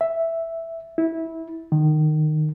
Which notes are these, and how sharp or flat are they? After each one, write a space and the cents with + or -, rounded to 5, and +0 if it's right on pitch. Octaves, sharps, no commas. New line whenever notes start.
E5 +0
E4 -20
D#3 -20